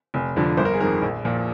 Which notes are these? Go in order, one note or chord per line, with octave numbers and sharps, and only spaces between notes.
F1
F2 D3 F3
G1 C5
A#4
G#4
F2 D#3 A#4
A#1
A#2 F3